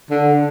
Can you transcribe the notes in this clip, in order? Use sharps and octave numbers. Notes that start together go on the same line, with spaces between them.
D3